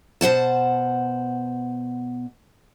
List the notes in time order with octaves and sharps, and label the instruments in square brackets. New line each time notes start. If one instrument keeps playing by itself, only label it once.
[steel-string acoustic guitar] B2 C5 F#5 A5